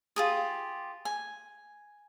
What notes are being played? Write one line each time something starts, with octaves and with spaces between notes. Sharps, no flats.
F4 G4 G#4
G#5